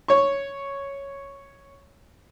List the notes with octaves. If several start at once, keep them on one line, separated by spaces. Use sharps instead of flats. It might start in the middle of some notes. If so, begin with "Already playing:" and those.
C#5 C#6